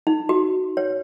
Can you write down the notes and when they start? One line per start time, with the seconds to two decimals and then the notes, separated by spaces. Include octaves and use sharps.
0.07 D#4
0.29 F#4
0.77 C#5